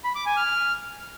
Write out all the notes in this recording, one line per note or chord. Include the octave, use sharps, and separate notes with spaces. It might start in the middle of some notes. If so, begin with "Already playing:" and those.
B5
D6
G#5
F6